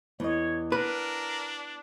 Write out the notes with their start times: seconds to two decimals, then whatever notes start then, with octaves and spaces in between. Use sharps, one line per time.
0.20 E2 C#5 D#5
0.72 B3 D4 A#4 B4